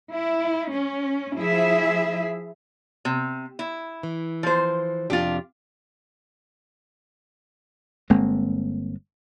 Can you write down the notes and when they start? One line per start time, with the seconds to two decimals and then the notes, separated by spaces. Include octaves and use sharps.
0.12 E4
0.74 C#4
1.37 F3 E4 G#4 E5
3.05 C3
3.59 E4
4.03 E3
4.43 F3 C5
5.10 F2 C3 D4 F4 G4
8.10 G1 G#3 A#3 C4